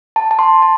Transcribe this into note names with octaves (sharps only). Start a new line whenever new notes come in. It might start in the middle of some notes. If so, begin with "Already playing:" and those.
A5
A5
C6
A5